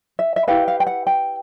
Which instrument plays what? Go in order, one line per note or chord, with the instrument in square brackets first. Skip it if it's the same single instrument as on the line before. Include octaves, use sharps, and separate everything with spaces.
[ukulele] E5
E5
E4 G4 B4 F5
F5
G5
F#5
G5